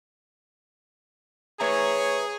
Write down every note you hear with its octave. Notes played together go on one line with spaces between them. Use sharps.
G#4 B4 C#5 E5 A#5